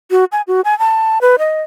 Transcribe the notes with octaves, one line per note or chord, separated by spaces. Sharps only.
F#4
G#5
F#4
G#5
A5
B4
D#5